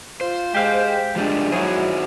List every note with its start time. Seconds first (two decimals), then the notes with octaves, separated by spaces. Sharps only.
0.21 F4 C5
0.54 G#3 G4 F5 G5
1.16 F3 G3 G#3 D4
1.52 F#3 D#4 E4 F#4 G#4 C5